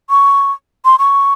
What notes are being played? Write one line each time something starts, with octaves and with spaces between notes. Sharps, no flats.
C#6
C6
C#6